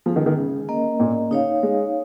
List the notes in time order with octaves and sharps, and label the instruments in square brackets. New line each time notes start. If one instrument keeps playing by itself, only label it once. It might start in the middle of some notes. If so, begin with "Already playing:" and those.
[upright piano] F3 [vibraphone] G#3 C#4 G#4
[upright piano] D#3
D#3
C#3
[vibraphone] A#3 C#4 A#4 D#5
[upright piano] A#2
[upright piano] C#3 [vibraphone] D#4 C#5 F5
[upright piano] G#3